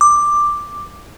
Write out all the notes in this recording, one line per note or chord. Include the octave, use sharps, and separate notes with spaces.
D6